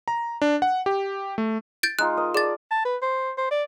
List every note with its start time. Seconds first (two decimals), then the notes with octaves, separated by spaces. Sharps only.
0.08 A#5
0.42 D4
0.62 F#5
0.86 G4
1.38 A3
1.83 G6 A6 D7
1.99 G#3 D#4 F4 F#6
2.17 A#4 D#5
2.35 G#4 D5 A5 A6
2.71 A5
2.85 B4
3.02 C5
3.38 C5
3.51 D5